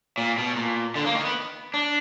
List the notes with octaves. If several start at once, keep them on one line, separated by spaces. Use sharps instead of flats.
A#2
B2
A#2
D3
A#3
D#3
B3
D4